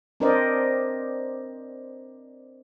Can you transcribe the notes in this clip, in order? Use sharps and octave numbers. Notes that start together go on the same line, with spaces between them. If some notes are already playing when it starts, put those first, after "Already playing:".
C4 D4 A#4 C5 D5 D#5